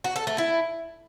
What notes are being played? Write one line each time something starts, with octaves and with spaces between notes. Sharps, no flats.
F#4
A4
A3
E4